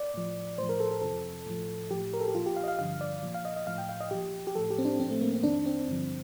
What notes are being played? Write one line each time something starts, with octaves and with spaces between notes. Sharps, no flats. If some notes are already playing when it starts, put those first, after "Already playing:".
Already playing: D5
A2 F3
A2 F3 C5
A#4
A4
A4
F2 C3 F3 A4
A2 F3
A2 F3 G4
A#4
A4
G4
A#2 F3 F4
G4
F5
D#5
F5
G2 D3 F3 F5
D5
A#2 F3
F5
D#5
D#5
A2 F3 F5
G5
F5
D#5
A#2 F3 G4
G4
A2 F3 A4
G4
C4
D4
A2 F3 C4
A3
A#3
C4
F2 D#3 D4
C4
G2 D3 F3